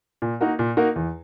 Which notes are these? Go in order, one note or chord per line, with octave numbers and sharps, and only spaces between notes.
A#2
A#3 D#4 F#4 A#4
A#2
A#3 D#4 F#4 A#4
E2